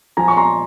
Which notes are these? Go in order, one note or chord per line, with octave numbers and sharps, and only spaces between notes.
F3 G#5 A#5
C#6
A#5 C6